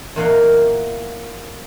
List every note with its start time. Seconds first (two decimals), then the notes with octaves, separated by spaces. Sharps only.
0.16 E2 A#2 F4 D#5 F5 F#5